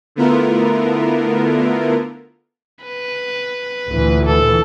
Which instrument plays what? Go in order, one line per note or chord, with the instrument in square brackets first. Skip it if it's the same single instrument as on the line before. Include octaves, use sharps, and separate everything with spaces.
[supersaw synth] D3 A3 B3 E4 F4 A#4
[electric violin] B4
[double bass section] D2 A#2 E3
[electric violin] A4